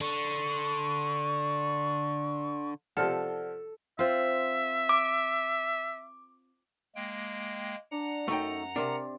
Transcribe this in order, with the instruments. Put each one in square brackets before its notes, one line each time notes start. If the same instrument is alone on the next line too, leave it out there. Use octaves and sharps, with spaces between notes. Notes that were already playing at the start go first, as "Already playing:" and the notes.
[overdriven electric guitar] D3 [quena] C#6
[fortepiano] C3 F3 F6 [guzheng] A4 [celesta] D5 F#5
[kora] C4 F4 [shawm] E5
[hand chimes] D6
[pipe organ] G#3 A#3 G5
[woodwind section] D4 [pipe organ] F#5 A#5
[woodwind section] F#2 [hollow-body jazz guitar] A3 D#4 G5
[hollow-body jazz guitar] C3 D4 [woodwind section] A#4